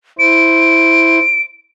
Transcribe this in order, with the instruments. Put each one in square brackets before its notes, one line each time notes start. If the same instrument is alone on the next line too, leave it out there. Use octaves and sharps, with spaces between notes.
[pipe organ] E4 C5 [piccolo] D7